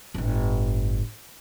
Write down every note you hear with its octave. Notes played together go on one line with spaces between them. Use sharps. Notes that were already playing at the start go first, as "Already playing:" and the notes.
G1 A2